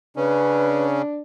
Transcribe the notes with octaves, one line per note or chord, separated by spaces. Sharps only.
C#3 C#4 D4 B4